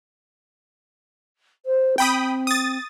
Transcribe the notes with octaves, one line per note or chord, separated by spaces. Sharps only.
C5
C4 G5 B5 D#6
D#6 A6